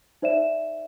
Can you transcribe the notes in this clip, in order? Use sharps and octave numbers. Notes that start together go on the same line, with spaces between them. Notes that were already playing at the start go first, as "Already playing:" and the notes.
D#4 C5 D5 E5 E7